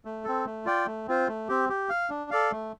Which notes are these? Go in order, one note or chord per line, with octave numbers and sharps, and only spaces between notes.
A3
C4 A4
A3
F4 D5 G5
A3
C4 F4 C5
A3
C4 G4
G4
F5
D4
A4 D5 F5
A3